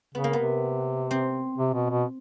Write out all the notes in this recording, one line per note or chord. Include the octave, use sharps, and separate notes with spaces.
C#3 B3
A#3
C3 B3
C4
C3
B2
B2